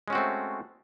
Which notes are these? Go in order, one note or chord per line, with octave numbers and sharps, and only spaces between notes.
G#3 A3 C4 C#4 F#4